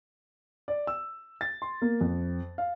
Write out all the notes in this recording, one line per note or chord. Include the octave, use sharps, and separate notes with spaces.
D5
E6
A6
C6
A#3
F2
F5